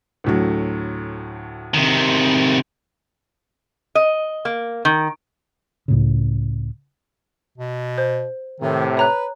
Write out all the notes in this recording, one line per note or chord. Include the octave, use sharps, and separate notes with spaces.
D2 A2 F#3
C3 D#3
D#5
A#3
D#3
C#2 A2 C#3
B2
C5
A2 C3 D#3
B4 C#5 A#5 F#6